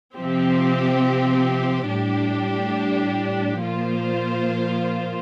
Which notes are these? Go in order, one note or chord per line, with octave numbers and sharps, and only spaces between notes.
C3 F3 C4 G4
A2 G3 D4 G4
A#2 F3 A#3 F4 C5